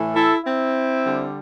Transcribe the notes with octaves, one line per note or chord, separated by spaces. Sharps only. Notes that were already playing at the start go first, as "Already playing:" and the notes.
Already playing: A2 E3 A3
E4 A4
C4 E4
D3 G3